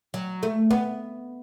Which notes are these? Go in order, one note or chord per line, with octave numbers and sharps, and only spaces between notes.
F#3
A3
B3